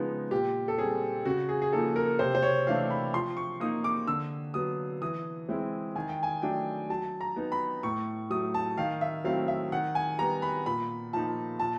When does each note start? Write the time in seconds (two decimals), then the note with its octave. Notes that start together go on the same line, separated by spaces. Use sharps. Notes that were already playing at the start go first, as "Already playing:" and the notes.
Already playing: C#3 F3 G#3 B3 D#4
0.31 A#2 G4
0.68 A4
0.78 G3 C4 G#4
1.25 C#3 F#4
1.49 G#4
1.62 G#4
1.73 F3 A#3 D#4 A4
1.96 A#4
2.19 C3 C5
2.35 C5
2.42 C#5
2.67 E3 A3 D4 F5
2.90 B5
3.14 F3 C6
3.37 C#6
3.60 A#3 D#4 D#6
3.84 D6
4.07 D3 E6
4.54 F#3 B3 D#6
5.02 E3 D#6
5.49 G#3 C4 E4
5.96 D#3 G#5
6.09 G5
6.23 G#5
6.42 F#3 A3 D4 G5
6.90 F#3 A5
7.21 A#5
7.36 B3 D#4
7.52 B5
7.83 A2 C#6
8.30 F#3 A3 D#6
8.54 A5
8.77 D#3 F5
9.01 E5
9.24 F#3 A3 C4 E4 F5
9.48 E5
9.72 D#3 F#5
9.95 G#5
10.18 G3 B3 A#5
10.42 B5
10.65 A#2 B5
11.13 F3 A#3 D#4 A5
11.59 A#2 A5